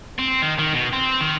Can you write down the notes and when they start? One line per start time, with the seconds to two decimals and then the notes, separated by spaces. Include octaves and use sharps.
0.19 C4
0.42 D#3
0.59 D#3
0.74 B2
0.93 C4
1.21 D#3